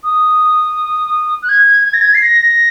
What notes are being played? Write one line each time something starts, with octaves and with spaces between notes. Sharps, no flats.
D#6
F#6
G#6
G#6
A#6
G#6
C7
A#6